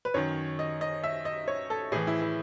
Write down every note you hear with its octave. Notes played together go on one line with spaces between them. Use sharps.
B4
F#2 D#3 C#5
D#5
D#5
E5
D#5
C#5
A4
A2 E3 G#4
E4
E4